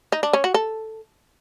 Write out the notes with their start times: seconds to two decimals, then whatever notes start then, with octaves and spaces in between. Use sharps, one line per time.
0.12 D#4
0.23 D4
0.33 C#4
0.44 F#4
0.54 A4